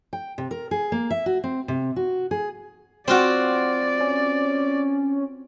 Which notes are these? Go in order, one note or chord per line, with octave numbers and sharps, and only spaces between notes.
G5
C3
A#4
G#4
A#3
E5
F#4
C4
C3
F#4
G#4
C4 F4 F#4 D5
C#4